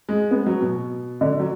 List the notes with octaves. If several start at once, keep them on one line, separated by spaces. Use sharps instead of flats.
G#3
B3
F#3
B2
D3
F#3